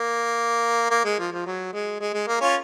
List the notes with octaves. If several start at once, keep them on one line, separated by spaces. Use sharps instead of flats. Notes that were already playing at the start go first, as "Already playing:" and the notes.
Already playing: A#3
A#3
G#3
F3
F3
F#3
G#3
G#3
G#3
A#3
C#4 F4